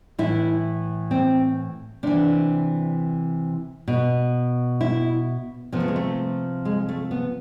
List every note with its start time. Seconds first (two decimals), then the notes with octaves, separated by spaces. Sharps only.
0.18 A2 E3 E4
1.11 C4
2.03 C3 E3 D4
3.88 B2
4.81 E4
5.72 C3 F3 B3
5.80 A3
5.88 G#3
5.96 A3
6.65 G#3
6.89 A3
7.11 B3